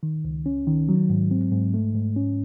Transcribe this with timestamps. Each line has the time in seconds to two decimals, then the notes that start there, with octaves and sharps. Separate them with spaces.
0.03 D#3
0.25 C#2
0.46 C#4
0.67 D#3
0.89 F#3
1.10 G#2
1.31 C4
1.52 G#2
1.74 A3
1.95 G#2
2.16 C#4